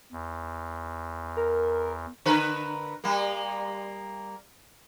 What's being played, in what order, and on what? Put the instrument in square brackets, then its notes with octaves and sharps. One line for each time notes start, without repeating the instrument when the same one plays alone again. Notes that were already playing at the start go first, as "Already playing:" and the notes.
[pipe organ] E2
[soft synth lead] A#4
[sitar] D3 A#4 B4
G3 A#3